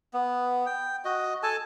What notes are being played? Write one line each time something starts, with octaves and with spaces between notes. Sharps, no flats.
B3
G5
F#4 D#5
A4 G#5 A5